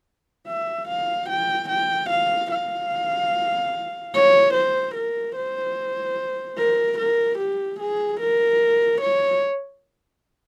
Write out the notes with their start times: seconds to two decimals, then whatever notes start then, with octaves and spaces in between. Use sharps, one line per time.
0.47 E5
0.88 F5
1.30 G5
1.69 G5
2.10 F5
2.51 F5
4.14 C#5
4.54 C5
4.95 A#4
5.36 C5
6.58 A#4
6.99 A#4
7.39 G4
7.80 G#4
8.20 A#4
9.01 C#5